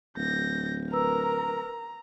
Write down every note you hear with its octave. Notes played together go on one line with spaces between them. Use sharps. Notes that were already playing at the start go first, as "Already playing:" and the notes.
D1 G6 A#6
A#4 B4 A#5 E6